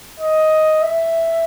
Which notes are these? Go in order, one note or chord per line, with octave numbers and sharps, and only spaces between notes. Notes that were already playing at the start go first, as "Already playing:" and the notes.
D#5
E5